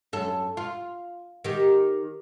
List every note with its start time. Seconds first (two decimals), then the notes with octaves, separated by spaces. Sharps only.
0.13 F#2 A4
0.57 F4
1.44 D#3 G4